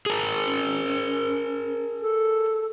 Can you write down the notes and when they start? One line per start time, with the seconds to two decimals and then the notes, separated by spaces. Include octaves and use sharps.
0.06 G#4 A#4
0.46 C#4
2.02 A4